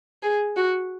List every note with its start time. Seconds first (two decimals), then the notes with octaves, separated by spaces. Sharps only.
0.23 G#4
0.56 F#4